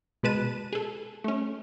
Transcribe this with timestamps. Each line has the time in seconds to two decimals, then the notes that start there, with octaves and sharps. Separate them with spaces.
0.23 B2 G#3 B4 A5 D#7
0.73 G#4 A4
1.24 A3 C#4